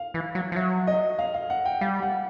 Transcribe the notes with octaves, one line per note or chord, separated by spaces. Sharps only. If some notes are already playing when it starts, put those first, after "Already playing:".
Already playing: F5
E3
F#3
F3
F#3 E5
D#5
F5
F5
F#5
G5
G3 F5
F#5